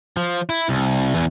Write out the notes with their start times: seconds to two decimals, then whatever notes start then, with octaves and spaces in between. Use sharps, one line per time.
0.17 F3
0.49 E4
0.69 C2
1.14 E2 E3